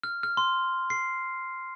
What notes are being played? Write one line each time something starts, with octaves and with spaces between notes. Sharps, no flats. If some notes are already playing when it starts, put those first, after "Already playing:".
F6
F6
C6
C7